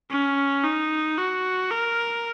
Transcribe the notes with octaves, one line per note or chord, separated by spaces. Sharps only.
C#4
D#4
F#4
A#4